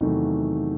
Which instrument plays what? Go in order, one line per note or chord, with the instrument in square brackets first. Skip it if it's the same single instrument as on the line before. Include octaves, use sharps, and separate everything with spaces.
[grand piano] E2 C3 D#3 F#3 A3